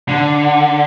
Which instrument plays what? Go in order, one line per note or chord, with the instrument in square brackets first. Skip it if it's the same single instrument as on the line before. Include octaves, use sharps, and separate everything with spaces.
[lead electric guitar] D3